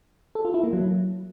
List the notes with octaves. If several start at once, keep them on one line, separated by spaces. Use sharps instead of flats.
A4
F4
E4
A#3
F#3